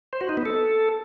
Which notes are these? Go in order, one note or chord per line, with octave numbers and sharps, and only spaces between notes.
C5
F#4
D#4
B3
A4